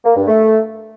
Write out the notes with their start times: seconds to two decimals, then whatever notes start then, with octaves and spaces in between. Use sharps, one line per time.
0.05 A#3
0.16 G2
0.28 A3